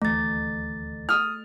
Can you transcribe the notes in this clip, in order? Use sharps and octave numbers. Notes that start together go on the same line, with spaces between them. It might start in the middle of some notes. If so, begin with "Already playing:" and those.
D#1 D2 E3 A3 A6
D#6 F6